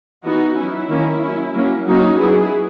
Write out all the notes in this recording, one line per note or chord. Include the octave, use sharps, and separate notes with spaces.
E3 B3 D#4 F#4
F#3 C#4 E4
D#3 A#3 C#4
F#3 C#4
F#3 A#3 C#4
F#3 A#3 C#4 D#4 F#4
F#3 B3 E4 G#4